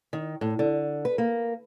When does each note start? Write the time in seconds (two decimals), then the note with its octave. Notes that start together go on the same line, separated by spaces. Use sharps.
0.13 D#3
0.41 A2
0.59 D3
1.05 B4
1.18 A#3